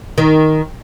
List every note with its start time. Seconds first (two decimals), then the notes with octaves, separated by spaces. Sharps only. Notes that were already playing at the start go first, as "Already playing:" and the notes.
0.18 D#3